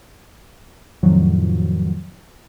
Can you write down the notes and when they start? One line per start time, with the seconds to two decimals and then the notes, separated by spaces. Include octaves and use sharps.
1.03 F2 A2 D#3 F3 F#3